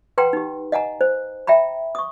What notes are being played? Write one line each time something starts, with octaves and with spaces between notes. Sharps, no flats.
B4 F#5 G5 A#5 C6
D#4 G4
D#5 F#5 G#5 A#5
C5
E5 G5 A#5 B5
C#6 D#6